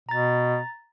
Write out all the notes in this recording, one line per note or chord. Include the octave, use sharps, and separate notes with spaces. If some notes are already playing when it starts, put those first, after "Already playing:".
B2 A#5 A6